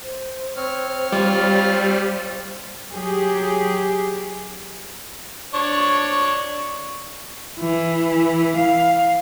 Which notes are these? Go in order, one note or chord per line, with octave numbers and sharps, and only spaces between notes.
C5
C4 C#5 F6
G3 F4
F#3 G4 G#4
D4 C#5 C#6
E3
F5